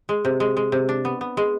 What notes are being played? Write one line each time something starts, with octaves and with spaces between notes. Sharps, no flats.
G#3
C3
G#3
G#3
C3
D4
B3
B3
G#3